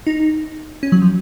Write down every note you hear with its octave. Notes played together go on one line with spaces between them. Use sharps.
D#4
C#4
F#3
F3